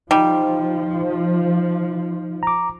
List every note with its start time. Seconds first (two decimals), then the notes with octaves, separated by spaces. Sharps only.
0.11 F3 G3 D#4
2.43 A#5 D6